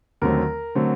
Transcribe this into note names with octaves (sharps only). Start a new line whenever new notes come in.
D#2 D3 F#3 A3 C4 A#4
D3 F#3 A3 C4